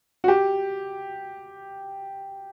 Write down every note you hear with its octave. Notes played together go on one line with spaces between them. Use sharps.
F#4
G4